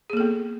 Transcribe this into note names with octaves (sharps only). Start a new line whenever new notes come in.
A#3 B3 G#4 A4